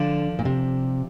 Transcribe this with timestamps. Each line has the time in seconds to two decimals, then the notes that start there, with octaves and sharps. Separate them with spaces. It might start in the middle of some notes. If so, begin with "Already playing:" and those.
Already playing: D3 F3 D4
0.39 A#2
0.45 C3